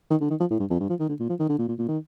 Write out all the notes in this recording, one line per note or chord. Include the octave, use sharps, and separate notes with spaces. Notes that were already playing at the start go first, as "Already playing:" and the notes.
D#3
D3
D#3
F3
A2
G2
F2
G2
F3
D#3
D3
A#2
F3
D#3
D3
A#2
A#2
A#2
D#3